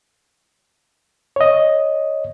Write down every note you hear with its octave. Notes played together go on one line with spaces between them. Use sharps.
C#5 D#5